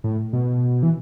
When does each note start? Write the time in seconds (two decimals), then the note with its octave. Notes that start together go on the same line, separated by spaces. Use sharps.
0.04 A2
0.33 B2
0.83 E3